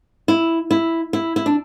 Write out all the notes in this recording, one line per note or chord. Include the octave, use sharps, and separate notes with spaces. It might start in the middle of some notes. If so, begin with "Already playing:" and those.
E4
E4
E4
E4
D4